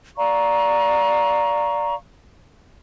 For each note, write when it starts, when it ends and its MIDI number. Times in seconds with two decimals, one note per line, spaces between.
0.17 1.94 74
0.17 1.94 77
0.17 1.94 82
0.17 1.94 85